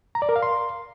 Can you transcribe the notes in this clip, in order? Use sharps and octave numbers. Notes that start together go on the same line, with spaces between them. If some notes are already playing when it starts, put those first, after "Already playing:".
A#5
D5
A#4
F5
C6